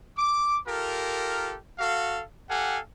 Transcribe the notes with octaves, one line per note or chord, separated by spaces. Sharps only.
D6
F4 G4 A4 A#4
F#4 A4 F5
G4 A4 F5 F#5 G#5